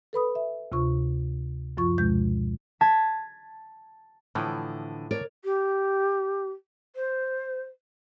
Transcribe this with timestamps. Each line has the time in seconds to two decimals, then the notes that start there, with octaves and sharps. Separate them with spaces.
0.13 A4 B4 B5 D#6
0.35 E5
0.72 D2 C3 F4 C#6
1.77 F#2 F3 F4 C#6
1.98 D2 B2 G#3 G6
2.81 A5 G#6 B6
4.35 A2 D3 E3 F3
5.11 A#4 C#5 D5
5.45 G4
6.96 C5